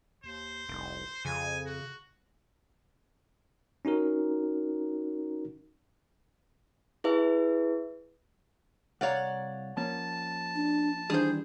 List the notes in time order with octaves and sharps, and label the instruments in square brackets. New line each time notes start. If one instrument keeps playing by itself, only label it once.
[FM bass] D#2 [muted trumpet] C5
[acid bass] F1 [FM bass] C2
[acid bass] F2 [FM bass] C#3 [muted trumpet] G#5
[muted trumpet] F#4
[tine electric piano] C#4 D#4 F#4 A#4
[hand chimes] E4 G#4 B4 E5
[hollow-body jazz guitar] C2 F5 A#5 [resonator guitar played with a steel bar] C#5 D5 F#5
[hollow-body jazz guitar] F3 A#3 C#4 [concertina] A5
[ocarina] D4
[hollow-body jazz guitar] D#3 E3 G3 [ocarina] D4 [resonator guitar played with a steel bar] G#4 C5